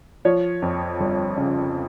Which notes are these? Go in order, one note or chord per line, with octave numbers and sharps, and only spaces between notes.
F3 C#5
F2
G1
C#3